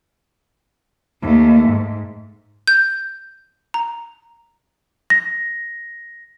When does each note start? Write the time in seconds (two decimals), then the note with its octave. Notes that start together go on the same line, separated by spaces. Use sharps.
1.22 D#2 A3
1.69 G#2
2.68 G6
3.74 A#5
5.10 A#6